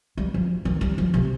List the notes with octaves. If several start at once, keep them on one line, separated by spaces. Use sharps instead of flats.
G3
F3
D#3
G3
F3
C3